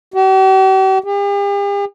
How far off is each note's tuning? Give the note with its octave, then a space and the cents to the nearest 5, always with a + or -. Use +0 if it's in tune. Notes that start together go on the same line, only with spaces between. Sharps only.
G4 -45
G4 +45